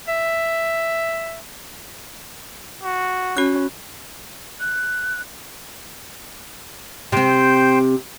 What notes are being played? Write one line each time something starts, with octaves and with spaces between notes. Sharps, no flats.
E5
F#4
C#4 F#4 F#6
F#6
C3 C4 C5 G5